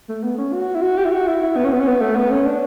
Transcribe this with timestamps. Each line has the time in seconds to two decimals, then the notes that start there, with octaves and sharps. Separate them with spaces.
0.09 A3
0.23 B3
0.38 C#4
0.53 F#4
0.75 E4
0.82 F#4
0.98 G4
1.05 E4
1.12 F#4
1.27 E4
1.42 E4
1.57 B3
1.64 C#4
1.72 B3
1.80 C#4
1.87 B3
2.01 A3
2.15 B3
2.31 C#4
2.46 D4